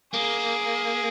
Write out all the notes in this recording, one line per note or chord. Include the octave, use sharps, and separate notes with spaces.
A#3 G#4